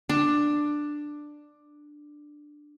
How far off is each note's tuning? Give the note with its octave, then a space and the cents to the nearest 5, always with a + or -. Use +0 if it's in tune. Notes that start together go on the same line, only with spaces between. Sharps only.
D4 +10